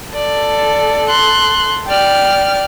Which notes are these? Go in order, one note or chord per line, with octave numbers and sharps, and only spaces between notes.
A4 D5
C6 F#6
D5 G5 F6